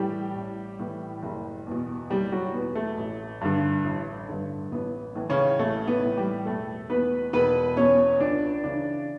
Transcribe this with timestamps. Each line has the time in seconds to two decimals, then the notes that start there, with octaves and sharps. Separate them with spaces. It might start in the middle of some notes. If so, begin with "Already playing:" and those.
Already playing: A2 E3 G3 G4
0.36 A1
0.79 A2 E3
1.23 F#1
1.66 E2 B2
2.10 F#1 G3 G4
2.32 F#3 F#4
2.54 E2 B2 B3
2.75 A3
2.97 A1
3.41 G2 D3
3.84 A1
4.28 G2 D3
4.72 A1 B3
5.15 A2 E3
5.29 C#3 C#4
5.59 A1 A3
5.87 B3
6.02 A2 E3
6.17 G3 G4
6.45 E1 A3 A4
6.89 E2 B2 B3 B4
7.33 E1 B3 B4
7.77 E2 B2 C#4 C#5
8.20 C#2 D4 D5
8.64 C#3 E3 D4 D5